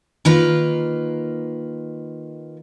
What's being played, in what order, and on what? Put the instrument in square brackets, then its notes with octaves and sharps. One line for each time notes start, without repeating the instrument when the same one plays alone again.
[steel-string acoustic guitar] D#3 A#3 F4 B4 F5